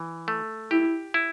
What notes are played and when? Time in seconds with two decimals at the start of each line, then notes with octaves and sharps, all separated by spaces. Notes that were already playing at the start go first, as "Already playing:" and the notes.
Already playing: E3
0.28 A3
0.71 E4 G4
1.14 E4